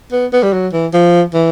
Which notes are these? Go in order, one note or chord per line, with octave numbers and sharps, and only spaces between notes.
B3
B3
G3
F#3
E3
F3
E3